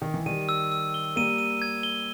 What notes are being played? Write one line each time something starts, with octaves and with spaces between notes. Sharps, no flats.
D#3
E3
D#3 G3 D#7
E6
E6
G7
G3 A#3 D#7
D#7
G#6
G7